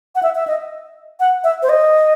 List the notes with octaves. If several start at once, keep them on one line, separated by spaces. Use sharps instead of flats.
F#5
E5
E5
D#5
F#5
E5
C5
D#5